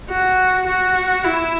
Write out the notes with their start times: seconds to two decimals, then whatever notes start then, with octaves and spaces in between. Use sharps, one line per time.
0.10 F#4
0.67 F#4
1.25 E4